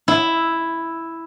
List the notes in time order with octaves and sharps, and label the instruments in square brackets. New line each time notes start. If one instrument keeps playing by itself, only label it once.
[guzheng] E4